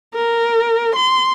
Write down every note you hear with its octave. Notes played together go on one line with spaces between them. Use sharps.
A#4
C6